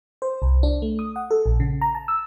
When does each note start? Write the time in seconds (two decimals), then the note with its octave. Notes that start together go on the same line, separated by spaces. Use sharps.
0.22 C5
0.42 C2
0.63 D4
0.82 A3
0.99 D#6
1.16 F#5
1.31 A4
1.46 A#1
1.60 C#3
1.81 A#5
1.95 A5
2.08 E6